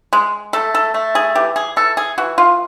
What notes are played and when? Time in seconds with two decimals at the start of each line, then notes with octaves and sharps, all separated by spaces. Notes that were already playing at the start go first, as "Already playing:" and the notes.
0.13 G#3
0.53 A3 A4
0.75 A4
0.94 A3
1.15 G#4
1.35 E3 G4
1.56 G#4
1.76 E3 A4
1.97 G#4
2.18 E3 F#4
2.38 F4